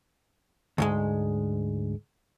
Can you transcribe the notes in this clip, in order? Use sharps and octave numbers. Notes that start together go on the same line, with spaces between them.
D2 G#2 G#3